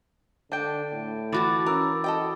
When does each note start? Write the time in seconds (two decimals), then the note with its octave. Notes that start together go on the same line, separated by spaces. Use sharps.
0.52 D3 D4 G5 A5 G6 D7
0.93 A2
1.33 E3 F#4 A5 B5 D6 A6
1.66 C#4 A#4 D6 E6
2.04 F#4 A4 D#5 G5